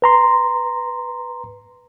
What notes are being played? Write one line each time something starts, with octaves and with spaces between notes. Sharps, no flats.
B4 A#5 C6